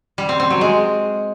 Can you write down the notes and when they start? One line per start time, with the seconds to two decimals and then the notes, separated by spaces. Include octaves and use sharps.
0.18 G3
0.29 C4
0.40 C4
0.50 F#3
0.61 G#3